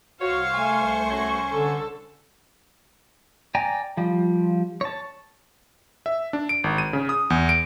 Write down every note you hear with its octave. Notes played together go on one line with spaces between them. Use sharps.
C2 F#4 C5 C#5 F5 C#6
A3 G#5
C#4 F#4
D3 A4
D5 G5 G#5 A#5
F3 G3
C#5 A5
E5
D4
D7
G#1
D#7
C#3
D#6
E2
D7